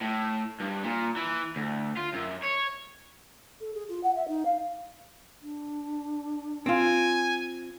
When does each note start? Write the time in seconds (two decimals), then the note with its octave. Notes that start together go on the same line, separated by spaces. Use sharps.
0.01 A2
0.60 G2
0.83 A#2
1.16 E3
1.56 D2
1.97 F4
2.14 F#2
2.44 C#5
3.60 A4
3.74 G#4
3.88 F4
4.03 F#5
4.15 E5
4.28 D#4
4.45 F5
5.42 D4
6.66 C4 F4 G#5